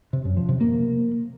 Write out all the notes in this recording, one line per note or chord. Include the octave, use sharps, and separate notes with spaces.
C3
F#2
F3
C3
A#3